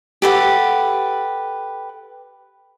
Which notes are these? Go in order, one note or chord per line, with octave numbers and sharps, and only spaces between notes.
G4 A4 B4 F#5